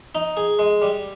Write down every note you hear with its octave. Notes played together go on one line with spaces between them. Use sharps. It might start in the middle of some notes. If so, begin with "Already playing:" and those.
D#4
G#4
G#3
G3